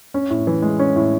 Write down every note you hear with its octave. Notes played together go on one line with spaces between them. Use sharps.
C#4
A2
E3
G#3
C#4
A2